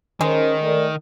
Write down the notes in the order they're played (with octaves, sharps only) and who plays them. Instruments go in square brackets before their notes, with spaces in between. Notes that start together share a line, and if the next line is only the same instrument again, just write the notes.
[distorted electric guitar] D#3 [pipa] G#3 [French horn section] C#4 A#4 C5
[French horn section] A3 A#4 D5